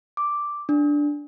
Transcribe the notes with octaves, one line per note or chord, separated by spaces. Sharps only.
D6
D4